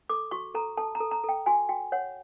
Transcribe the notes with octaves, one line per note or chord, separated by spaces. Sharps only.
A4 D6
F#4 C#6
A4 A#5
A4 A5
A#5
A4
A#5
A4 G5
F#4 G#5
F#4 G5
C#5 F#5